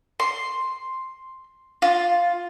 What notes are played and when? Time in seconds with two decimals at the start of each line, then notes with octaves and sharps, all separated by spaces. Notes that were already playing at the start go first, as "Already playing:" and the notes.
0.20 C6
1.82 F4